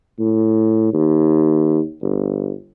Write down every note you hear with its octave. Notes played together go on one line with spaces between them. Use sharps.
A2
D#2
G1